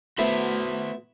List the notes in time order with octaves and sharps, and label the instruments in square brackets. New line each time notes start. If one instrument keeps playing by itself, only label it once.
[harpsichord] A3 B3 E4 [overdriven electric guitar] F#4 C5